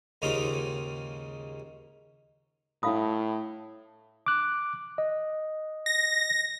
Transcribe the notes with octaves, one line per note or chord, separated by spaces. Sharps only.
D#2 G#2 C#3 D#4 F4 D6
A2 E4 F5 B5 D#6
D6 F#6
D#5
A#6